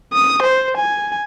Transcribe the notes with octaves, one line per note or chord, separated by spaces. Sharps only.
D#6
C5
G#5